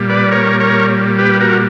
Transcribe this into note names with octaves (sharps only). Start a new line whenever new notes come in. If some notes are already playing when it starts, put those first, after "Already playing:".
Already playing: A#2 G3
B4 D5
A#4 C#5
A#4 C#5
G4 B4
F#4 A#4